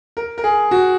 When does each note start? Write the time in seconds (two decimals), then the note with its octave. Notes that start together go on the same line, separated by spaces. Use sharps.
0.17 A#4
0.38 A#4
0.44 G#4
0.71 F#4